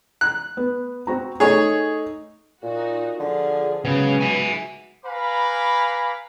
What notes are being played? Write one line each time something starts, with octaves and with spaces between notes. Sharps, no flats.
F#6
B3
C4 F#4 A#5
A3 D#4 G#4 C#5
A#2 D#4 F#4
D3 F3 F4 G#4
C#3 F#3 G#3 B3 F#4
E5 G#5
B4 F5 G#5 A#5 B5 D6